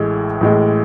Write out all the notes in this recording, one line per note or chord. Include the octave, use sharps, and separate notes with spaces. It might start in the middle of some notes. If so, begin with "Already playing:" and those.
Already playing: A1 A2 G#3
A1 A2 G#3